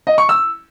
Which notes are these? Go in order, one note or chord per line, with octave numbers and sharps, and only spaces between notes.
D#5
C#6
E6